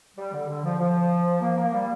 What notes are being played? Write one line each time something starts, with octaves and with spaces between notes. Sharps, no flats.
G3
D3
D3
F3
F3
A#3
A#3
G3